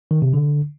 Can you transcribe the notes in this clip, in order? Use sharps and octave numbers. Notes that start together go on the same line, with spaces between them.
D#3
C3
D3